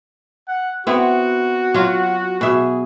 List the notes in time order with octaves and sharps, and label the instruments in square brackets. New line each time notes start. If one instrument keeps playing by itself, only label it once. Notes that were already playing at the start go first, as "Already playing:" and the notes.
[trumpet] F#5
[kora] B3 C4 E4 [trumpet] F#4
[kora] F#3 F4
[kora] B2 E5 [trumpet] G#4